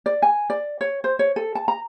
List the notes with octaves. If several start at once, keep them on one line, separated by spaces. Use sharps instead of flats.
D5
G#5
D5
C#5
C5
C#5
A4
A5
A#5